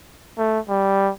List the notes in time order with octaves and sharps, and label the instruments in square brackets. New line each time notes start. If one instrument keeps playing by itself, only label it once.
[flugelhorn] A3
G3